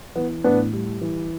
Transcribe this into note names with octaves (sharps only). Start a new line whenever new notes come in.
E3 B3
A2 B3 D4
G3
E3